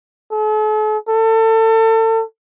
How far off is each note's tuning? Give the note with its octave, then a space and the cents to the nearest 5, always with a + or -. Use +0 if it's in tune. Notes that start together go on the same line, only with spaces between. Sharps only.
A4 -45
A4 +30